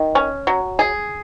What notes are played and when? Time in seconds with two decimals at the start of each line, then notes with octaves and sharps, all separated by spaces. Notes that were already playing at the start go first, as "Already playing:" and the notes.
Already playing: D#3
0.15 C#4
0.47 F#3
0.79 G#4